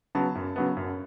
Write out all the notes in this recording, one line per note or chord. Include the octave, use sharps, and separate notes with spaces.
C#3 F#3 B3 A5
F#2
C#3 F#3 B3
F#2